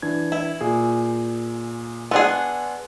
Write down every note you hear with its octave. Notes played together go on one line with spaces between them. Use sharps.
E3 D4 G#6
E4
A#2 G#4
B3 D4 G#4 G#5 C6 E6